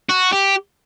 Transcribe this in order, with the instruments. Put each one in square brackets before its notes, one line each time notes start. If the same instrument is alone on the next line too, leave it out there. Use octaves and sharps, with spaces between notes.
[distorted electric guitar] F#4
G4